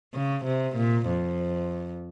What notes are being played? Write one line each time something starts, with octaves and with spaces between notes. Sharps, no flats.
C#3
C3
A#2
F2